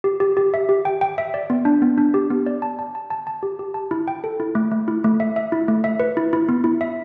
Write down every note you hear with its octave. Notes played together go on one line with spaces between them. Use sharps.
G4
G4
G4
E5
G4
G5
G5
E5
D5
B3
D4
B3
D4
G4
B3
D5
A5
A5
A5
A5
A5
G4
G4
A5
E4
G5
A4
E4
A3
A3
E4
A3
E5
E5
E4
A3
E5
B4
E4
E4
B3
E4
E5